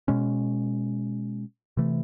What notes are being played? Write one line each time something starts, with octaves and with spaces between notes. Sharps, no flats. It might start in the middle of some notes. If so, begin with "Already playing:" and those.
B2 G#3 C#4
C3 E3 A3